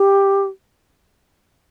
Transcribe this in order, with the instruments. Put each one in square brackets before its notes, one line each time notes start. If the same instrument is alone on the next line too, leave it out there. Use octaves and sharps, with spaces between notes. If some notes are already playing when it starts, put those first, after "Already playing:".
Already playing: [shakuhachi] G4